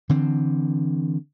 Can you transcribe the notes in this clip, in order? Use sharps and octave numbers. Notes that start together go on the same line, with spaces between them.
D3 E3 C4